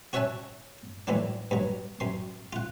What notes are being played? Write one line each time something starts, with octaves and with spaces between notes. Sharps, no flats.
F#4 C#5 E5 F#5 G#5 A5
A2 E3 F#3 D4
G2 F#3
F#2 C6
F4 F#5